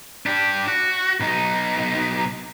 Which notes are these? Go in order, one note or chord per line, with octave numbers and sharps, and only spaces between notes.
D4 G4
F#4
B1 D#4